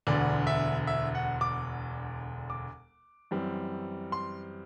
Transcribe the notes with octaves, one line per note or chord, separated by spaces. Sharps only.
E1 D2 D3 D5
E5
E5
F#5
D6
D6
F#2 E3 G3 C4
C6